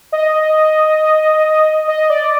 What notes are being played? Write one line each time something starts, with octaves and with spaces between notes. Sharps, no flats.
D#5
D#5
D5